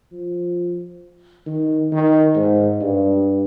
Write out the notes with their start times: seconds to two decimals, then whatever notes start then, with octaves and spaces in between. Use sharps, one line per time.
0.12 F3
1.46 D#3
1.92 D#3
2.36 G#2
2.81 G2